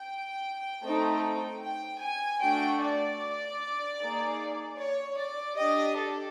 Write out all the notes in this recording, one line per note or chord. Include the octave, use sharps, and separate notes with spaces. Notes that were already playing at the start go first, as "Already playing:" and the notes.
Already playing: G5
A3 C4 D#4
G5
G#5
A3 D4 F#4 G5
D5
A#3 D#4 G#4
C#5
D5
D4 G4 D#5
A4